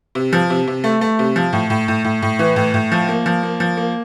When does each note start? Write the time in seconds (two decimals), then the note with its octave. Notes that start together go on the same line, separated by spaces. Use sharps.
0.15 C3
0.33 F3
0.50 C3
0.67 C3
0.84 A3
1.01 A3
1.19 C3
1.36 F3
1.53 A2
1.70 A2
1.88 A2
2.04 A2
2.22 A2
2.39 E3
2.56 A2
2.74 A2
2.92 F3
3.09 A#3
3.26 F3
3.43 A#3
3.60 F3
3.77 A#3